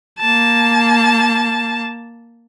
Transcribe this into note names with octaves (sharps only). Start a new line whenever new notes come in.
A#3 A5